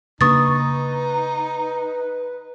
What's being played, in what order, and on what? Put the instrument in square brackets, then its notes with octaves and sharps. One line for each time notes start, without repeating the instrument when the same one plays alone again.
[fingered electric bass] C#3 A#3 D4 [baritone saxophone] D#4 [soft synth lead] B4 [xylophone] C#6 D#6 A6